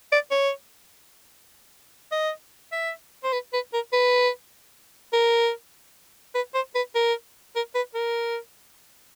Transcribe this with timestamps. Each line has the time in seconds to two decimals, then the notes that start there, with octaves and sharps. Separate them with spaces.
0.12 D5
0.31 C#5
2.12 D#5
2.72 E5
3.23 C5
3.32 B4
3.53 B4
3.73 A#4
3.93 B4
5.13 A#4
6.35 B4
6.54 C5
6.75 B4
6.95 A#4
7.55 A#4
7.75 B4
7.94 A#4